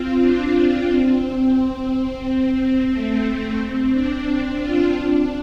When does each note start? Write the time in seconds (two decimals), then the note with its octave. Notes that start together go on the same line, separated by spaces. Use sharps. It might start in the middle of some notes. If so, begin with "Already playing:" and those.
Already playing: C4 F4
0.19 D4
0.87 C4
2.90 A3
3.58 C4
3.91 D4
4.24 D4
4.59 F4
4.92 D4